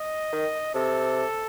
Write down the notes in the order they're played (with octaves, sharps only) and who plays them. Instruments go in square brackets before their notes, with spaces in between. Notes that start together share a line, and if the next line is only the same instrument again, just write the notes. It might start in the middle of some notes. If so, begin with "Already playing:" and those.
Already playing: [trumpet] D#5
[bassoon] D#3
[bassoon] C3 [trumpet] A4